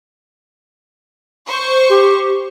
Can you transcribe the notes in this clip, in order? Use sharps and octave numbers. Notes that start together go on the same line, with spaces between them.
C5 C#6
G4